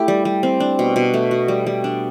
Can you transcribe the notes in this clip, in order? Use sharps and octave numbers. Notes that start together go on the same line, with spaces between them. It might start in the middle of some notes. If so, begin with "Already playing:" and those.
Already playing: A3 E4 G4
G3
G3
C4
D4
B2
B2
A3
F#4
G3
G3
D4